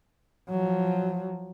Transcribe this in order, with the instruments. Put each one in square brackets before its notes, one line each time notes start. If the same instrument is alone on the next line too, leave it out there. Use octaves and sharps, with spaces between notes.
[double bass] F3 F#3